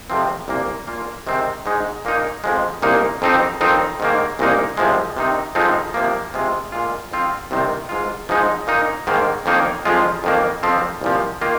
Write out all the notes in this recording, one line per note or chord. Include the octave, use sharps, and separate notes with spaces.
F2 C3 F3 C4
C2 A#2 A#3
A#2 A#3 F4
C3 D#3 G#3 C4
G#2 G#3 D#4
A#2 A#3 D#4
F2 F3 G#3
C2 A#2 A#3 D#4
F2 F3 C4 D#4
F2 D#3 C4 D#4
G#2 D#3 A#3
C2 A#2 A#3 D#4
C2 C3 F3 G#3
C3 D#3 C4 D#4
F2 F3 G#3 C4 D#4
C3 F3 A#3
C3 G#3 F4
A#2 G#3 F4
F2 F3 C4 F4
C2 C3 D#3 C4
G#2 G#3 F4
G#2 F3 G#3 D#4
A#2 A#3 D#4
G#2 D#3 A#3
F2 D#3 A#3 D#4
F2 F3 G#3 F4
F2 D#3 A#3
F2 F3 C4
C2 A#2 F3
D#3 A#3 F4